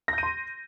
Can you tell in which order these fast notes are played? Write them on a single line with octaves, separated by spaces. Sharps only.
A#6 G6 D#7 C6